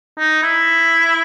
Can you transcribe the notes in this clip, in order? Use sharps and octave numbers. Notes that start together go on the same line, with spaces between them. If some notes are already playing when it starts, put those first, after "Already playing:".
D#4
E4